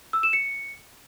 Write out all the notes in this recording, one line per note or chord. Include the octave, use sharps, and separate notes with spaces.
E6
E7
C#7